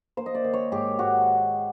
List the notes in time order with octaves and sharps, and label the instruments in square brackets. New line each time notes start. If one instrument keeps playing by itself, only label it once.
[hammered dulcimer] A#3 C5
D#5
D5
D#3
C#5
G#2 G4
G#2 F#4